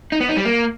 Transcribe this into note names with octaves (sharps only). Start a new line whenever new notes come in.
D#4
B3
D#4
G3
A#3